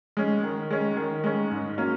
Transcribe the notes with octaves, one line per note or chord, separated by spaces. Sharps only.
G#3 C#4
D#3
G#3 C#4
D#3
G#3 C#4
G#2
F#3 A#3 C#4